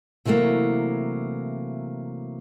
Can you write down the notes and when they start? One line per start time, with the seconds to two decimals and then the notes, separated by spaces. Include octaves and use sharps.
0.25 C3 E3 F#3 A3 A#3